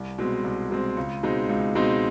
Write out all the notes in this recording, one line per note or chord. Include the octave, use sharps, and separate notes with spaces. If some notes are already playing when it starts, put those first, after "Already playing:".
Already playing: C2
B2 G#3 C4
C2
B2 G#3 C4
C#2
B2 G#3 C4 D#4
C#2
B2 G#3 C4 D#4